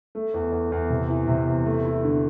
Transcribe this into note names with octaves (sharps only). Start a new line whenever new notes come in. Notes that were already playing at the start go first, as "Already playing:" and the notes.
A3
E2
E2
E2
C3
E3
C3
E2
A3
E4
D3